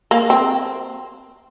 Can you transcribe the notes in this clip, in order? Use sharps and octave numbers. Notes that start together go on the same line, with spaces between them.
A#3
C4